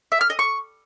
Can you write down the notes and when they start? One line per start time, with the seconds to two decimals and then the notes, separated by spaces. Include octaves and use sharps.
0.12 E5
0.21 F6
0.30 D#5
0.39 C#6